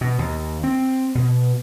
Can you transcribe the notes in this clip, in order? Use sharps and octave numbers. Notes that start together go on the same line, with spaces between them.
B2
D#2
C4
B2